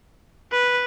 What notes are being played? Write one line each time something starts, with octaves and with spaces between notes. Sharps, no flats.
B4